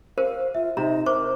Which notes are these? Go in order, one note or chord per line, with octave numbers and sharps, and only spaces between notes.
G4 A#4 C5 F5
F4 E5
C3 D#4 A#5
A#4 C5 C#6 D6